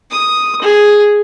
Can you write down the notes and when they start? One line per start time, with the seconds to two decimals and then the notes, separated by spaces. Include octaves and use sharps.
0.10 D#6
0.61 G#4